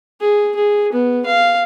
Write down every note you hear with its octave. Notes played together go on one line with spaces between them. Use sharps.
G#4
G#4
B3
F5